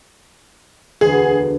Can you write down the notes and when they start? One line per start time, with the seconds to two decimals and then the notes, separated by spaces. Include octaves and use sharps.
1.01 E1 D2 G#4